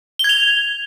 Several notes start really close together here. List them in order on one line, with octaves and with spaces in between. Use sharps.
G7 G#6 F7